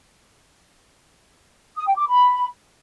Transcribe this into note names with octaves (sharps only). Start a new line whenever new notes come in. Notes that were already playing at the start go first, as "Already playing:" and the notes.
D#6
G5
D6
B5